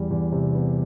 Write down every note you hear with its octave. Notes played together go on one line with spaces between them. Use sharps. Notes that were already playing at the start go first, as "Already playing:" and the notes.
Already playing: E2 G3
E2
C3
B3